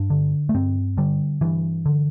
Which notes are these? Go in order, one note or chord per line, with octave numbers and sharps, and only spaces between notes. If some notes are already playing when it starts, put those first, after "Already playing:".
Already playing: G2 D4
D3
A3
G2 C4
D3 G3
G2 E3
D3